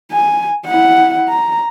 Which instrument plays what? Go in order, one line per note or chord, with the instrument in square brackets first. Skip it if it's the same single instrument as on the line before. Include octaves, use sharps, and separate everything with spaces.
[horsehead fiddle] G#5
E4 F#5
A#5